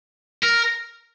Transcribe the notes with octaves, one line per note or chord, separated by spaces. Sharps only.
A#4